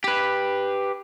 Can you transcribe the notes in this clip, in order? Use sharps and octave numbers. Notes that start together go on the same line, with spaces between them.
G4 B4